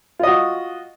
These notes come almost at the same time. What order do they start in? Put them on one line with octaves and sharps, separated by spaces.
F4 D#5 F#4